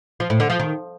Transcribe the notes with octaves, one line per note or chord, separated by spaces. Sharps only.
F3
A2
D3
F3
D#3